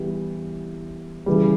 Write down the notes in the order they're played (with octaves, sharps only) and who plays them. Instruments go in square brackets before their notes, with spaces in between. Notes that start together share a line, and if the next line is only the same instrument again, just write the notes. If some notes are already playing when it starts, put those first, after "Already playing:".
Already playing: [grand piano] E3 G3 B3 E4 G4
C#3 E3 G3